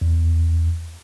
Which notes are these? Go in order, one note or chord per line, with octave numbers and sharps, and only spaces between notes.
E2